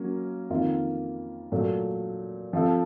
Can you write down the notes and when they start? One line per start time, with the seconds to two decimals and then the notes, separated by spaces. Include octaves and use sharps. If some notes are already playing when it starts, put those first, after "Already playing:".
Already playing: F#3 A#3 C#4
0.50 F2 D#3 A#3 F4
1.52 A#2 F#3 A3
2.53 F3 C4 F4 A4